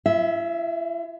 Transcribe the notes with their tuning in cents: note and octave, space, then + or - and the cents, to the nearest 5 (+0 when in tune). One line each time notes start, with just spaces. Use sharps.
E4 +45 E5 -15